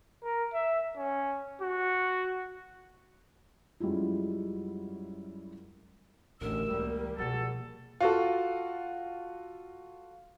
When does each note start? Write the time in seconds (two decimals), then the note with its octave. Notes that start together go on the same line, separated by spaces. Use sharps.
0.24 A#4
0.54 E5
0.97 C#4
1.62 F#4
3.80 F#2 G3 G#3 E4 F4
6.41 A1 F#2 D3 A#4 E6
6.71 C#2 E3 G3 A#3
7.18 B2 F3 F#4 G#4 A4
8.01 F4 F#4 A4